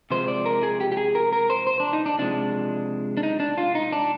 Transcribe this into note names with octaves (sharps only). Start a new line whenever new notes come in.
C3 F3 G#3 C5
D5
A#4
G#4
G4
G4
G#4
A#4
A#4
C5
C5
D4
D#4
D4
C3 F3 G#3 D4
D4
D#4
D4
F4
D#4
D4